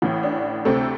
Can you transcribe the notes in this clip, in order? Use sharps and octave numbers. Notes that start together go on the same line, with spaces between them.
A1 A2 E3
D4
D2 C3 A3 C4 A4